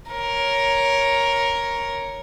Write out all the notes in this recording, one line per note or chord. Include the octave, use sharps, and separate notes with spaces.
A#4 C#5